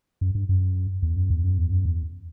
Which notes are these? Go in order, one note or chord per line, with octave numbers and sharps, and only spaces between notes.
F#2
G2
F#2
E2
F#2
E2
F#2
E2
F#2
E2